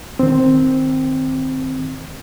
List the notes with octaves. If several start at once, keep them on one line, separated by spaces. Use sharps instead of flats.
D#3 C4